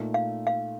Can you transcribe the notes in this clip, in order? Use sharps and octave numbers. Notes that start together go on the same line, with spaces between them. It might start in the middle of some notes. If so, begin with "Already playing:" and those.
Already playing: A#2 A3 D#4
F5
F5